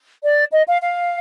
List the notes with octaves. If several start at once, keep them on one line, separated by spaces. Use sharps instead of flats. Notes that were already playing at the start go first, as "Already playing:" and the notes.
D5
D#5
F5
F5